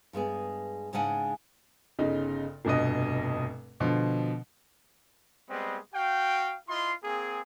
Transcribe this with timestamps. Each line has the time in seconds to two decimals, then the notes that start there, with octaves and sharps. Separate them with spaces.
0.13 G2 G#3 B3 G#4
0.93 G#2 C#3 G#3 D4 F#5 G#5
1.99 G1 C#3 D#4
2.65 F1 G2 B2 D#5
3.80 B2 D3 F3
5.49 G3 G#3 B3 C4 D#5
5.94 F#4 F5 G5
6.69 E4 F4 D#5 C6
7.04 A#3 C4 G#4